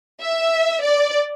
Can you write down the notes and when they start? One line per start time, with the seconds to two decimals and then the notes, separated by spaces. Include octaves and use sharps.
0.21 E5
0.81 D5